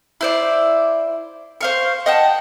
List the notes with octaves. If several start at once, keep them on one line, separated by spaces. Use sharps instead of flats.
E4 C5 D5
C5 F5 C#6
D#5 F#5 G5 A5